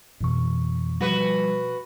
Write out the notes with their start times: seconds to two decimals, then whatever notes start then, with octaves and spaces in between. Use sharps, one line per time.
0.21 F2 B2 E3 A#3 C#6
1.01 F3 G3 F#4 B4